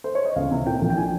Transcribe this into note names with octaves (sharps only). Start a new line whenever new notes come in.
C5
C#5
D#5
C#2 F5
C3
A#2 G5
A#1
G5
F3 G#5